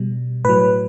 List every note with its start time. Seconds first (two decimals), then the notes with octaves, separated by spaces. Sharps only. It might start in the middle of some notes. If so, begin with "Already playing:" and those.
Already playing: B2 G3
0.45 A2 F#3 B4